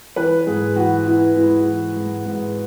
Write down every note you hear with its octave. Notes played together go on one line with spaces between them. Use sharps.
E3 B4
G#2 G#4
E3 F#4
E3 E4
G#2 E4
E3
G#2
G#2